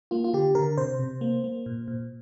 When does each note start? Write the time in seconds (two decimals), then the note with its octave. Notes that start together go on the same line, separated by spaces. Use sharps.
0.11 A#3 F4
0.24 F4
0.34 D3 G4
0.55 D3 A#4
0.77 C3 C5
0.99 C3
1.21 A#3
1.44 A#3
1.66 A#2
1.88 A#2